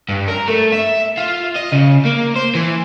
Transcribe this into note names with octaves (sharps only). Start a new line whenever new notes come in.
G2
A#4
A3
E5
F4
D#5
C#3
A#3
C5
E3